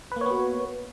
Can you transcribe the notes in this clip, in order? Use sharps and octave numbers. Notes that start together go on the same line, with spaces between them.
A#3 B3 F#4 B4 C#5